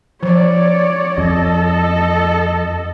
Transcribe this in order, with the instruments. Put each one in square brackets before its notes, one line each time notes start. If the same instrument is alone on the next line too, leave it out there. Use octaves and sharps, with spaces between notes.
[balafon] F3 [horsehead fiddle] C#5 D5
[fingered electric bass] F2 [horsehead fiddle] A4 D#5